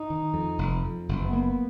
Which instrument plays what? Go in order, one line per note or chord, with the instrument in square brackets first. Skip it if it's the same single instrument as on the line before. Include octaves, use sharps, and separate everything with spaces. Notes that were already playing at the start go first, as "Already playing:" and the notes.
Already playing: [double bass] D#4
[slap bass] D#3
F2
F1
F2
F#1
[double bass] B3
[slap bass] A#3